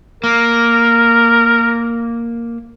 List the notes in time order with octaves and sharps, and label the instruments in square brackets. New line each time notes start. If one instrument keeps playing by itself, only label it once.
[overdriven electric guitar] A#3 [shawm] A#4